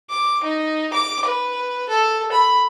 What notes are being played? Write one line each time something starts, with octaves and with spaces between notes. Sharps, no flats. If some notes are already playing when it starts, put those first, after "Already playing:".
D6
D#4
D6
B4
A4
B5